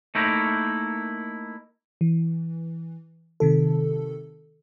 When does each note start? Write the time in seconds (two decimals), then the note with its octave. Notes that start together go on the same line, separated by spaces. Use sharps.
0.15 A3 A#3 D#4 E4 A#4
2.01 E3
3.40 C3 D#3 A4